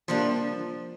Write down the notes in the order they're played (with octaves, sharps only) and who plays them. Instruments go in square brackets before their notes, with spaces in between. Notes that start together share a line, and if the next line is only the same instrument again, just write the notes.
[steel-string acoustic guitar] C3 G3 A#3 D4 [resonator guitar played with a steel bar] F3